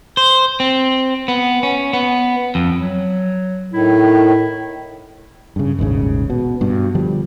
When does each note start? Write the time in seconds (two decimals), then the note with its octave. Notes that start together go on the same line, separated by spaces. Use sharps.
0.17 C5
0.60 C4
1.28 B3
1.63 C#4
1.93 B3
2.55 F2
2.79 F#3
3.73 A2 D#3 E4
5.56 G2 C#3
5.79 D#1 G#1 G#2 C#3
6.30 B2
6.61 G2 B2
6.95 D3 F3 G3